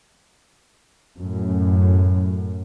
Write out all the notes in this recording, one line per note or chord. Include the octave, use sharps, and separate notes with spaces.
F#2 A2